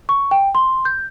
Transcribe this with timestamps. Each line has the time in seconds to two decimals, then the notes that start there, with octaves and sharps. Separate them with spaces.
0.09 C#6
0.31 G5
0.55 C6
0.85 G6